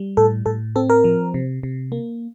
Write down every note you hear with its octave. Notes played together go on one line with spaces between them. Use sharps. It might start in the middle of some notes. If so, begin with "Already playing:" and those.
Already playing: G3
A2 A4
A2 A4
C4 A4
A#4
F3
C3
C3
A#3